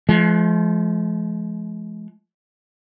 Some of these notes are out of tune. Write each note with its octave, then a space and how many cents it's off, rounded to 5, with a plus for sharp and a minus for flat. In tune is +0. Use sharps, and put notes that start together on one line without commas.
F3 -25 G#3 +40